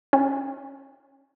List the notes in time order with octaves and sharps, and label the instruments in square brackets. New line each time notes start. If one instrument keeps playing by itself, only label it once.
[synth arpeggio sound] C#4